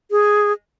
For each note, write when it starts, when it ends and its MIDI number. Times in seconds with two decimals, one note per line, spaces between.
0.11 0.52 68